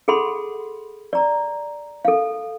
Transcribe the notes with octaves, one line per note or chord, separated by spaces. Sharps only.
G#4 A4 F#5 B5 C6
D5 A#5
A4 F5